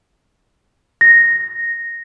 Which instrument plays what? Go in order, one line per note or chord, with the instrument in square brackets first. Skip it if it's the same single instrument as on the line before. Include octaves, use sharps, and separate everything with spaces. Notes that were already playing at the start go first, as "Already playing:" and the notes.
[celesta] A#6